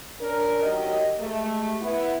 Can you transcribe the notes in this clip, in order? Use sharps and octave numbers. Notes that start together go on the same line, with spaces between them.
C#4 D4 A#4
D#3 F#3 G4 D#5
G#3 A3 G4
B3 E4